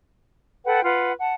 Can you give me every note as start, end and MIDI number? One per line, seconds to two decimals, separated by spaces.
0.65 0.81 69
0.65 0.81 71
0.65 0.81 78
0.65 0.81 79
0.83 1.12 65
0.83 1.12 71
0.83 1.12 78
1.20 1.34 78
1.20 1.34 81